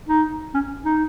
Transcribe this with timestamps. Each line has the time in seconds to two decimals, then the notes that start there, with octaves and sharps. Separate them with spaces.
0.09 D#4
0.54 C#4
0.85 D#4